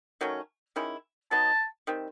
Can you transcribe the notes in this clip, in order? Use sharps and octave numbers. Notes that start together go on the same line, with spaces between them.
D#3 F#3 A3 C#4
D#3 G#3 C#4 E4
F#3 B3 D#4 A5
D#3 G3 C4